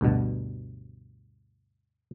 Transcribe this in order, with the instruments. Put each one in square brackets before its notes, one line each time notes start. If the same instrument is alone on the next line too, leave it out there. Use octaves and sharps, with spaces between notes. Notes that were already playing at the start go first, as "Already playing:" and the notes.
[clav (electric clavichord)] D2 G2 B2